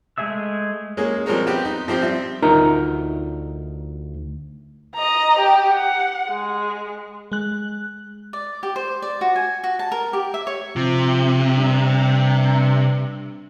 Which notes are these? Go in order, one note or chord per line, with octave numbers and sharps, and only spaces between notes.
G#3 A3 G#4 E5 E6
G#3 A#3 C#4 G#4
F3 G3 G#3 C4 A#4 C#5
B3 C4 G4
D#4
F3 C4 G4 C5
G3 C4 E5
D2 D#4 F4 A#4 E5 A#5
D#5 A#5
G4
F#5
G#3
G#3 F#6
D5
G4
C5
D5
F#4
G#5
F#4
A5
A#4
G4
E5
C#5
C3 F3
G2